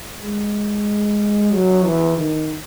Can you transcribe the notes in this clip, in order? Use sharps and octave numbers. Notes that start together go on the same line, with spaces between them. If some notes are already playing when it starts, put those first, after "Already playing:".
G#3
F#3
E3
D#3